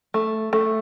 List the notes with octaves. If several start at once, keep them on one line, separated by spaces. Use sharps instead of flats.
A3
A3